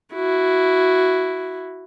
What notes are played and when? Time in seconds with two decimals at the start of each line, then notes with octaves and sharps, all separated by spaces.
0.14 E4 F#4